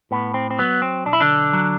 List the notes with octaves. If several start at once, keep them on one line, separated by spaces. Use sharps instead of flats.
A2 B3
C4
C4
F#3 B3
C4
B1 D4
E4
D3 D4
F#3